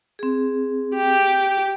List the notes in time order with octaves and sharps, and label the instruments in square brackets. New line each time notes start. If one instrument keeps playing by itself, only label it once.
[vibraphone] C4 G#4
[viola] G4